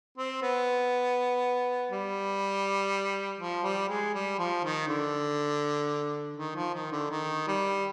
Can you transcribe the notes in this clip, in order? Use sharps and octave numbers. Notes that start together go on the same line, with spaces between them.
C4
B3
G3
F3
G3
G#3
G3
F3
D#3
D3
D#3
F3
D#3
D3
D#3
G3